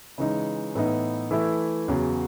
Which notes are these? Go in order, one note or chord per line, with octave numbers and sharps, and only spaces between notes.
C#3 E3 G#3 D#4
A2 E3 B3 D#4
E3 A3 E4
E2 C#3 F#3